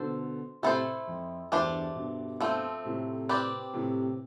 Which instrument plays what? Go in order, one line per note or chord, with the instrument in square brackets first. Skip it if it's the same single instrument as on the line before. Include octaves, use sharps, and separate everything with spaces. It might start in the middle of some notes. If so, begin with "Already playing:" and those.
Already playing: [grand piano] B2 D3 [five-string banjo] A4 C5
[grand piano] A2 C3 [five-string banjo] A3 E4 A4 C5
[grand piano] F2
[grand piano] E2 G2 [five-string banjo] A3 D4 G4 C5
[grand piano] G2 B2
[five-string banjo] F3 A3 C4
[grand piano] A2 C3
[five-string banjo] C4 G4 B4 D5
[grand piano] A2 C3